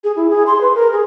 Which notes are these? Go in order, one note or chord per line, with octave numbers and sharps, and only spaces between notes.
G#4
E4
G#4
C6
B4
A#4
G#4